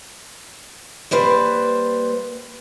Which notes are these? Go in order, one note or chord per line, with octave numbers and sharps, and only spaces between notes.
G3 A#3 B4 C5